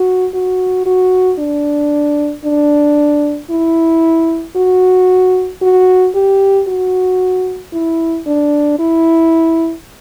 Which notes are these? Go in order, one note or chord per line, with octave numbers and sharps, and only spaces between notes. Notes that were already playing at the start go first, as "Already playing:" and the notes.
Already playing: F#4
F#4
F#4
D4
D4
E4
F#4
F#4
G4
F#4
E4
D4
E4